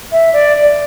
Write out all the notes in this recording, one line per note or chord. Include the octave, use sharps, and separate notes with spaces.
E5
D5